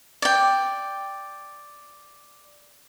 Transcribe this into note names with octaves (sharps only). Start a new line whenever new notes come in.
D5 G5